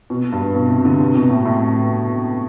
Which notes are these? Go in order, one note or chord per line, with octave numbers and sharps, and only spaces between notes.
B2
G2
B2
C3
D3
C3
B2
A2
A2